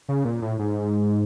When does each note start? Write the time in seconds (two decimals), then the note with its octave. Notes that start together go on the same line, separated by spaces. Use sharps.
0.08 C#3
0.25 A#2
0.42 A2
0.59 G#2